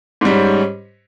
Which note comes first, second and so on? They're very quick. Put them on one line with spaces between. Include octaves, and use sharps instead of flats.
G#2 G3 C#4